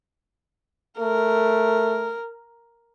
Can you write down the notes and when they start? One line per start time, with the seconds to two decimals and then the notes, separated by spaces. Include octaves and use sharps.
1.00 A3 A#4